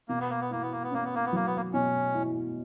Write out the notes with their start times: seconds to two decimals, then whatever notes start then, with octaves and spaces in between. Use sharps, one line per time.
0.09 B2 A#3
0.20 B3
0.30 A#3
0.41 B3
0.50 A#3 E4
0.62 B3
0.72 A#3
0.83 B3
0.91 A#3 C#4
1.04 B3
1.15 A#3
1.25 B3
1.32 F#3 A#3
1.47 B3
1.57 A#3
1.73 B2 C#4
2.14 E4